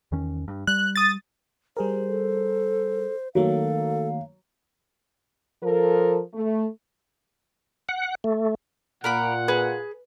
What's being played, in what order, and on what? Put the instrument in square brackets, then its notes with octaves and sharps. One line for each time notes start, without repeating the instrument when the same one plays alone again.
[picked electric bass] E2 D#3 C#4
G2
[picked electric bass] G3 [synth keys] F#6
[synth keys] D#6 A6
[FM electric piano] G3 G#4 A#4 [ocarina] C5
[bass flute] A4
[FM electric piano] D#3 A3 A#3 [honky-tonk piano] F#3 [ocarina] A4 [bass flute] F5
[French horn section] F3 A4 A#4
A3
[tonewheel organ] F#5
A3
[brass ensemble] A#2 [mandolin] A#4 B5 D6 [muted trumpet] F#5
[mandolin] G#4 [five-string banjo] B4